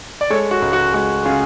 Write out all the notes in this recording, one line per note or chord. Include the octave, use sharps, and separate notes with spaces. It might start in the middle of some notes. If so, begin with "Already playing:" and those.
D5
G#3 A4 C#5
F#4
C#2
F#4
G#3 F#4
C#3 F4 G#4